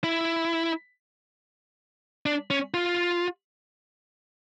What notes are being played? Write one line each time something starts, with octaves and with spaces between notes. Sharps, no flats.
E4
D4
C#4
F4